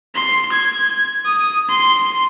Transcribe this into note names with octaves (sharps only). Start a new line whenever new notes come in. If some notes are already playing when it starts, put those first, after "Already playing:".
C6
G#6
D#6
C6